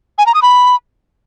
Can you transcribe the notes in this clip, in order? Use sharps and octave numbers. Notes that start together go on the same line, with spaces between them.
G#5
A#5
D#6
B5